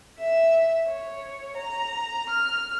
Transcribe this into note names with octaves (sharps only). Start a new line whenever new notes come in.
E5
C#5
A#5
F6